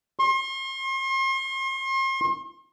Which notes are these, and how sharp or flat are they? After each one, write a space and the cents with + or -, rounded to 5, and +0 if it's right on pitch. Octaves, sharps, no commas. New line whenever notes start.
C6 +40